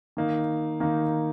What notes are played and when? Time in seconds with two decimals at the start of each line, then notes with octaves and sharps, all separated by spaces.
0.17 D#3 A#3 D#4
0.80 D#3 A#3 D#4